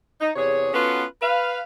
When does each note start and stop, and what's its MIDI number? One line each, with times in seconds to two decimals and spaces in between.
0.21 0.31 63
0.36 0.71 40
0.36 0.71 48
0.36 0.71 68
0.36 0.71 73
0.73 1.04 59
0.73 1.04 61
0.73 1.04 65
0.73 1.04 66
0.73 1.04 69
0.73 1.04 71
1.22 1.60 71
1.22 1.60 77